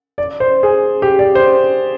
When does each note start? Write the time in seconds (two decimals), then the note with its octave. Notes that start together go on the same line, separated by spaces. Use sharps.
0.18 D5
0.40 C5
0.63 G#4
1.02 G4
1.19 D5
1.35 C5